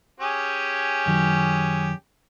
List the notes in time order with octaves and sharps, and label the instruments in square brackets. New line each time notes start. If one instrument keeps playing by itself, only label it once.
[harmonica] C#4 G4 G#4
[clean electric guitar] F#2 D#3 F#3